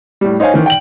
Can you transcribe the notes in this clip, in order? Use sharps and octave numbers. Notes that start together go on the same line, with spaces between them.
A2 G3
D#4 C5 C#5 F5 G#5
D#3 E3
G5 F#7